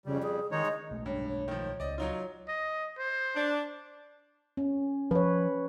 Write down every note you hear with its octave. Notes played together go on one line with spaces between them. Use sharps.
F2 C#3 G3
G#4
D#3 G#3 D#4 C#5
D#5
B1 G#3 A3
G2 C#5
C#5
D#3 F3
C#2 D5 D#5
F#3 D#4 F4 C#5
D#5
C5
D4
C#4
F3 B4 C#5